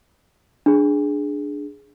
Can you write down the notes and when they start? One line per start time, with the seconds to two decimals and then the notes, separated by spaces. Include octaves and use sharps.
0.66 D4 G#4